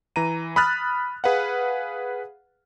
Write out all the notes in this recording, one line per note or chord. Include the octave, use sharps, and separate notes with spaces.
E3 A#5 D#7
B5 D#6 F6 F#6 A6
G#4 B4 F5 F#5